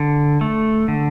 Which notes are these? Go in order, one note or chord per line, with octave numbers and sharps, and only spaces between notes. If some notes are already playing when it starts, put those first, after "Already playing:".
Already playing: D3
A3
D3